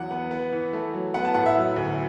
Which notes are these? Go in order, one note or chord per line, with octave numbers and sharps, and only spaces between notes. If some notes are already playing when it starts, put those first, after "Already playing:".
Already playing: E2 F#3 F#5
B3
B3
E3
A3
F#3
B3 F#5
A5
A2 F#5
E5
F#3
D2